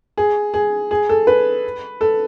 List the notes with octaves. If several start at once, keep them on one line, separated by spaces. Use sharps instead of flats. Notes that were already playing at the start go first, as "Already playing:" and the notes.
G#4
G#4
G#4
A4
B4
A4